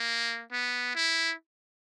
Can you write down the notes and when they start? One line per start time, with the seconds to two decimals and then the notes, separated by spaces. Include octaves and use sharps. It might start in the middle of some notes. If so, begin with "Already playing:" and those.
Already playing: A#3
0.52 B3
0.95 E4